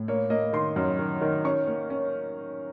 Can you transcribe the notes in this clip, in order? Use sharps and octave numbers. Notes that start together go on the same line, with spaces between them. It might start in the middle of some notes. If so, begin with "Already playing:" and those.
Already playing: A2
A#3 C#5
A#3 D#5
D#3 C6
F#2 C6
D#3
D#3
C#4 C#6
A#3
C#4